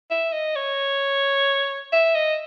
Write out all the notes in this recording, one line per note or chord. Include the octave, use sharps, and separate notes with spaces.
E5
D#5
C#5
E5
D#5